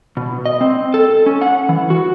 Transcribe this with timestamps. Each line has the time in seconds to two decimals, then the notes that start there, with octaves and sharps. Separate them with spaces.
0.17 B2
0.46 D#5
0.61 C4
0.94 A4
1.26 C#4
1.41 F#5
1.69 E3
1.90 F#4